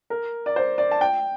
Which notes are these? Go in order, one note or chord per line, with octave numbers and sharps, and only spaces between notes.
A#4
D5
C5
D5
A5
G5